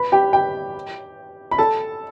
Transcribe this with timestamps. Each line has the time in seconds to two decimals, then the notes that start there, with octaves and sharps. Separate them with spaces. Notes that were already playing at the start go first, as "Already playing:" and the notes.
Already playing: B4 B5
0.12 G4 G5
0.33 G4 G5
1.51 B5
1.58 A4 A5